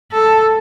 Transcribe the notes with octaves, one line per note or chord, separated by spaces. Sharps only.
A4